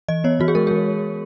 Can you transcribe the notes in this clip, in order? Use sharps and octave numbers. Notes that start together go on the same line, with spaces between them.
E3 D#5
B3 C#5
E3 F#4
G#4
G#3 A#4
G#4
E3